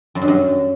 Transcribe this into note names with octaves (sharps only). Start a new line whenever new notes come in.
F#2
G2
F#2